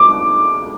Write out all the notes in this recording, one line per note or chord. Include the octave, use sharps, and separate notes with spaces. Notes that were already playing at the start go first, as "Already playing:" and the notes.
Already playing: D6